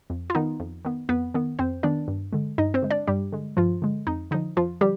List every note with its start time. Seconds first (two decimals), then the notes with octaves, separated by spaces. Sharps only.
0.10 F2
0.30 F4
0.35 D#3 B3 D#4
0.60 F2
0.85 D#3 B3
1.09 F2 B3 B4
1.34 D#3 B3
1.59 F2 C4 C5
1.83 D#3 B3 D4 D5
2.08 G2
2.33 D3 G#3
2.58 G2 D#4 D#5
2.74 C4 C5
2.83 D3 G#3
2.91 D4 D5
3.07 G2 G3 G4
3.32 D3 G#3
3.57 G2 F3 F4
3.82 D3 G#3
4.07 F2 D#4
4.31 D3 D#4
4.34 F3
4.57 F2 F3 F4
4.81 D3 F3 G3 G4